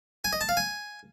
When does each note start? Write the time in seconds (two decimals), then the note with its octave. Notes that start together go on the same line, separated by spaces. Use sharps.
0.24 G#5
0.33 D#5
0.41 A5
0.49 F5
0.57 G#5